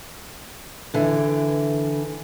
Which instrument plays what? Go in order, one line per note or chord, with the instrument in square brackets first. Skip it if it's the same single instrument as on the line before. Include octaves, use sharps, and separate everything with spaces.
[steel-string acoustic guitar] D3 E3